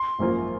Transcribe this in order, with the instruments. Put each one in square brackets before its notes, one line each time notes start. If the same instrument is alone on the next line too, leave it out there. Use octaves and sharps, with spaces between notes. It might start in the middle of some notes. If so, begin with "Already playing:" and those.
Already playing: [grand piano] C6
[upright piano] G#1 F#2 F3 A#3 F4